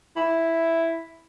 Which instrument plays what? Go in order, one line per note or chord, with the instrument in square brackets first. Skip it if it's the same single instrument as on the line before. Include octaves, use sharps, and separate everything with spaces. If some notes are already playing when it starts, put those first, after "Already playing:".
[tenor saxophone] E4